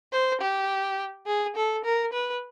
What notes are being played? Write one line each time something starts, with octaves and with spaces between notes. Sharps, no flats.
C5
G4
G#4
A4
A#4
B4